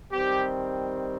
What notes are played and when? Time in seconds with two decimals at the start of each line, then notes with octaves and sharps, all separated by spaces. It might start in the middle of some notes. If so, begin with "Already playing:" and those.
0.12 D#3 G3 C4 G4